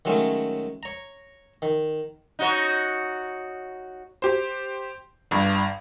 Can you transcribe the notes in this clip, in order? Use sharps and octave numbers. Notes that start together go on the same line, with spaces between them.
D#3 F#3 G#3 A3 C#4
C#5 A#5
D#3
D#4 F#4 C#5
G4 C5
G1 G2